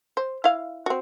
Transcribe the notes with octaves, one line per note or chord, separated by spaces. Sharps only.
C5
E4 F5
C4 F#4